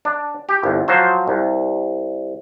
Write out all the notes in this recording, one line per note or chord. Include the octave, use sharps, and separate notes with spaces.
D4
G4
G1 C2
F3 F#3 C5
C2